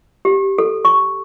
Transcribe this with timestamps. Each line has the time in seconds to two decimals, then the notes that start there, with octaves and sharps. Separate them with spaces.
0.25 G4
0.58 A4
0.85 C#6